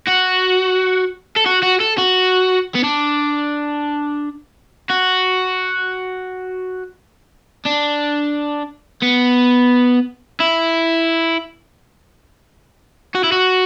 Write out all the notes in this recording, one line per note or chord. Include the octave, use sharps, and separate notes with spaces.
F#4
A4
F#4
F#4
A4
F#4
B3
D4
F#4
D4
B3
E4
F#4
E4
F#4